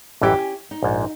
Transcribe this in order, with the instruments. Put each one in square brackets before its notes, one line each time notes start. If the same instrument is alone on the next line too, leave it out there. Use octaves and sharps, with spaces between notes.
[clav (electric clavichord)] A1 F#2 E3 [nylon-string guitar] C#4 E4 G4
[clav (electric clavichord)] G#5
[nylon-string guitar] D#4
[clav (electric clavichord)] A#1 G#2